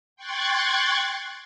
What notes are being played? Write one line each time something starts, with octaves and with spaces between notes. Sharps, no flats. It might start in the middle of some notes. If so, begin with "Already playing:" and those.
G5 C6 C#6 F#6 G#6 A6